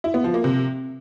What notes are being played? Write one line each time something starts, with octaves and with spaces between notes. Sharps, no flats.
E4
B3
F3
A#3
C3